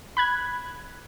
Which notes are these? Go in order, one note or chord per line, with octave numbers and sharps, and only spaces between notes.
B5 F#6 G#6